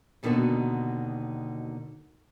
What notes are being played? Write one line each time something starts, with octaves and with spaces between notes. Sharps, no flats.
D#2 B2 D3 D#3 F#4 A4